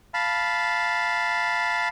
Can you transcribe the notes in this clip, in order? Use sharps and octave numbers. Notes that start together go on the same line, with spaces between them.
F5 A5 B5